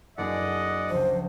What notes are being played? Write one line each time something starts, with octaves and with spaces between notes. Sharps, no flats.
F#1 D4 G#4 D5 D#5 F#5
C#2 F3 C5